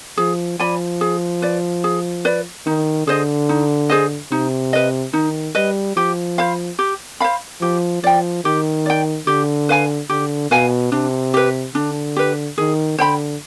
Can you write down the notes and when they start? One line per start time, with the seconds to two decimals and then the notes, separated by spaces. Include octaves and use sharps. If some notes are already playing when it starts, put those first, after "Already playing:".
0.17 F3 G#4
0.59 F3 D5 G#5 B5
1.01 G#4
1.42 B4 D5
1.84 G#4
2.25 B4 D5
2.66 D#3 D#4
3.07 D3 G#4 C5 D#5
3.49 D#4
3.90 G#4 C5 D#5
4.31 C3 D#4
4.73 B4 D#5
5.13 D#3 D#4
5.55 G3 B4 D#5
5.97 F3 G4
6.38 C5 F5 B5
6.79 G4
7.20 C5 F5 B5
7.61 F3 G4
8.03 F3 D5 G5
8.45 D#3 G4
8.86 D5 G5
9.27 D3 G4
9.69 B4 F5 G#5
10.10 D3 G4
10.51 B2 B4 F5 G#5
10.92 C3 D4
11.34 G4 B4
11.75 D3 D4
12.16 G4 B4
12.58 D#3 G#4
12.98 D3 C5 G5 B5